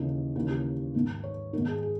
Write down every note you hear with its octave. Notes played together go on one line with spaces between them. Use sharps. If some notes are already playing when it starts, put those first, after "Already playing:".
Already playing: D#2 C#3 E3 D#4
D#2 C#3 E3 E4
G4
G#2 D#3
C#5
G#2 D#3 A#4
G#4
G#4